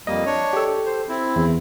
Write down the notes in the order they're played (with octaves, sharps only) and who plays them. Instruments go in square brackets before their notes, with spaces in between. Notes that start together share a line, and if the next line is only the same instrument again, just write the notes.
[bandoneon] F2 G3 A#3 [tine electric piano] D#5
[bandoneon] D4 C#5
[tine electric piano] G4 A4
[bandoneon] C5
C4 E4
[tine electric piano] E2